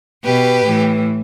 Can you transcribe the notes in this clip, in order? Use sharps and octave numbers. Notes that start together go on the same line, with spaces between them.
B2 G4 B4
A2 E3